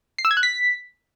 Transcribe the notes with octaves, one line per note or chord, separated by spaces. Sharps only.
C7
E6
G#6
F#6
B6